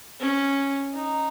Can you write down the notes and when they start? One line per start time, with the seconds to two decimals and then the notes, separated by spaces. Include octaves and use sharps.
0.20 C#4
0.94 D#4